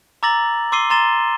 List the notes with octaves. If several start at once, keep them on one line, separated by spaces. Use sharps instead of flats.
A#5 D6 E6 A6 A#6 F#7
C6 D6 E6 C7 D#7 G7
A#5 C6 A6 E7 G7